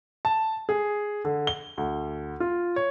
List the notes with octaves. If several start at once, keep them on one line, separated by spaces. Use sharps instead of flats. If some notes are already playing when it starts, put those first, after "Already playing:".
A5
G#4
D3
G7
D2
F4
C#5